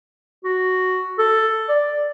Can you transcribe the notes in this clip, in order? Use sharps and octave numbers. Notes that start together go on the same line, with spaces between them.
F#4
A4
D5